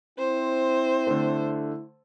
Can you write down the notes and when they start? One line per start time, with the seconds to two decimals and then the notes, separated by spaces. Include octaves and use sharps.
0.19 C4 E4 C5
1.07 D3 A3